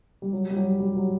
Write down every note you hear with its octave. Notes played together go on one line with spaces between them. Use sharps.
G3
F#3
G3
F#3
G3
F#3